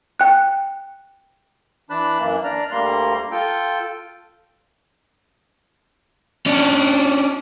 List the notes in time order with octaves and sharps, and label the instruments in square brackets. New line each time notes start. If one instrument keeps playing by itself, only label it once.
[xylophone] G5 F#6
[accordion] E3 D4 A5 B5 F#6
F#2 E3 A#3
D4 D5 A#5 F6
D2 G3 A#3 A#5 C6
F4 A4 G5
[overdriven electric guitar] C#4 D4